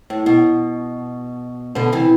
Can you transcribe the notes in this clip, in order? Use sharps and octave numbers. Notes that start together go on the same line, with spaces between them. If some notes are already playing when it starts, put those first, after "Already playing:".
A2
B2
B2 D3
C3 E3